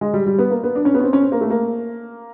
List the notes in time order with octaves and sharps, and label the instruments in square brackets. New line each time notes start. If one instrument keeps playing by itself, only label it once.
[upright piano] G#3
G3
G3
B3
A#3
B3
D4
C#4
B3
C#4
C4
C#4
C4
A#3
A3
A#3